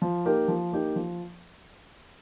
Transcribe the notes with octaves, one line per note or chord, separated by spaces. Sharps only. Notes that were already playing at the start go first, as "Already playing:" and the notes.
F3
A#3 D#4 G4 A#4
F3
A#3 D#4 G4 A#4
F3